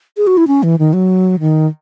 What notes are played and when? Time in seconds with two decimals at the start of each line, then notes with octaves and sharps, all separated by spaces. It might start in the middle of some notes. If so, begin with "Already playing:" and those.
0.17 G#4
0.27 F#4
0.37 E4
0.47 C#4
0.63 E3
0.79 D#3
0.93 F#3
1.40 D#3